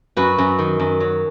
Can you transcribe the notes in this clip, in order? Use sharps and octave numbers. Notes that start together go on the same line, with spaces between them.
F#2 F#4 B4
F#2
D#3
F#2
F#3